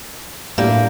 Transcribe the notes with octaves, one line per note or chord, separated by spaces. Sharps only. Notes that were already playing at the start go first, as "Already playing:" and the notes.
A2 G3 A#3 D4 G6